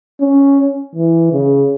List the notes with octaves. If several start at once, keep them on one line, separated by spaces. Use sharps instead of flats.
C#4
E3
C#3